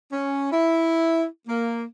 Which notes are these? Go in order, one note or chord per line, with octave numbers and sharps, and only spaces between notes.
C#4
E4
A#3